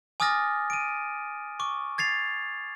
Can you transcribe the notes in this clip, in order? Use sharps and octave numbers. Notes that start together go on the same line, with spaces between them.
G#5 D6 D#6 F6 A6 A#6
D7 D#7
C#6 D6
G#6 A6 C7 F7